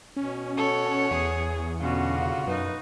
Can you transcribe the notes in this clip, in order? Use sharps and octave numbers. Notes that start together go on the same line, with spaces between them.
B2 C#4
A4 C#5 F#5
E2 G#4
B2 D3 C#4 F4 F#4
C#3
F#2 D#4 B4